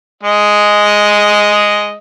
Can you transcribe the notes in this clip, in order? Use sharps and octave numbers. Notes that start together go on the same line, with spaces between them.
G#3 D#5